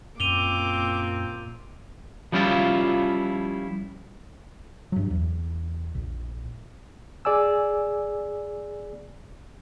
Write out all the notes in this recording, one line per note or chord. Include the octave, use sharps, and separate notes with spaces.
F#2 A#2 C4 D6 D#7 F7 G7
F3 G3 C#4 E4 F4
G2 F#3
E2
A#1
G#4 D5 G#5 E6